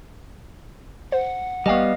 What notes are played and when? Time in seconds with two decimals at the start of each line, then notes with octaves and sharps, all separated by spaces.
1.12 C5 F#5
1.66 A1 G3 B3 D#5 F5 G5 C#6